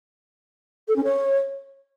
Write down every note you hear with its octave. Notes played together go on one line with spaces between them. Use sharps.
A4
C#4
C#5